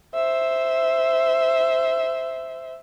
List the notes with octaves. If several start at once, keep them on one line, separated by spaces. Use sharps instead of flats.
C5 E5